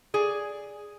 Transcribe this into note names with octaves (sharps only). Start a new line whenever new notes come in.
G#4 D5